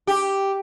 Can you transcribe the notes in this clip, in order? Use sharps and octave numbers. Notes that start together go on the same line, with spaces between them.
G4